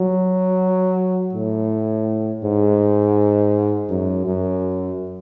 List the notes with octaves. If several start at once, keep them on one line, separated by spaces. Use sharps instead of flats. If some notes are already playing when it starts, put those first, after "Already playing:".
Already playing: F#3
A2
G#2
F#2
F#2